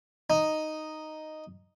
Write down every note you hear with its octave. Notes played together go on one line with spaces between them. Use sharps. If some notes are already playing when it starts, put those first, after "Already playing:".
D#4